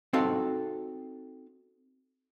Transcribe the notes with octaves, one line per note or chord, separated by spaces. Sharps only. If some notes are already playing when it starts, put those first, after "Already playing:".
C4 D#4 F#4 A4 F5